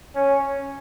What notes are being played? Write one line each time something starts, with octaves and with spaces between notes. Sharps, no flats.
C#4